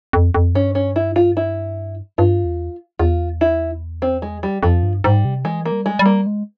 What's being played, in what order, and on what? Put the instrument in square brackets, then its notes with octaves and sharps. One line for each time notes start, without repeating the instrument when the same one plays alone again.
[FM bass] F2
F2
[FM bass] G2 [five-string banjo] C#4
[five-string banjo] C#4
E4
F4
E4
[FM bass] G2 [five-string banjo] F4
[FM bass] E2
[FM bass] E2 [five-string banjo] F4
[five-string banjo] E4
C4
G#3
G3
[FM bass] F2 [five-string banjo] F3
[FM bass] G2
[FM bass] G#2 [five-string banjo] G3
[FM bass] C3
[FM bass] E3 [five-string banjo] G#3
[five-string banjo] A#3
[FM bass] G3
[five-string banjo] G#3
[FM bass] G3
[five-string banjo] A#3
[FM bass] G#3